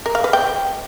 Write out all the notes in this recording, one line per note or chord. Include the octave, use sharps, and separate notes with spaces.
A#4
F5
B4
G5